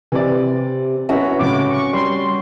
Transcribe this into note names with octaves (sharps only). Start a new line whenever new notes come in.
C3 E3 D5
B3 C#4 E4 F#4 E5 A#5
C#2 A2 C3 D6
C#6
G3 C6